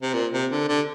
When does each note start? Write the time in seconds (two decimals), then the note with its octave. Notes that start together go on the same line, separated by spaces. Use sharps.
0.02 C3
0.14 A#2
0.33 C3
0.51 D3
0.68 D3